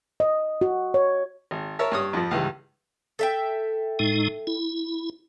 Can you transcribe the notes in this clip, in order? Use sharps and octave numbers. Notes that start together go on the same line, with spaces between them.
D#5
F#4
C#5
G#1
A#4 C#5 E5 A5
G2 C#5 D#6
F2 F3
C#2 G2 E3
A4 E5 G5
A2 G#3 D#4
E4